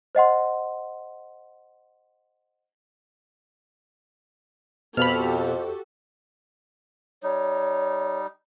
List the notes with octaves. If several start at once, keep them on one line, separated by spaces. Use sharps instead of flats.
C5 D#5 F#5 C6
F2 B2 F#4 G4 A4 B5 F6
G3 D#4 C#5